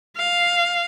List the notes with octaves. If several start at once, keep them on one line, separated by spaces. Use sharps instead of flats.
F5